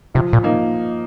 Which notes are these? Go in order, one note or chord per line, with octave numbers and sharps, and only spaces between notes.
C3 F3
A#2
A#3 D#4